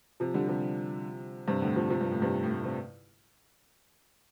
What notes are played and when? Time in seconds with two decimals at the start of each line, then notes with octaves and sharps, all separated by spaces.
0.20 C3 F3
0.34 D3 G3
0.48 C3 F3
1.47 G2 C3
1.62 A2 D3
1.76 C3 F3
1.90 C3 F3
2.01 G2
2.11 A2
2.22 G2 C3
2.43 A2
2.54 A2
2.65 C3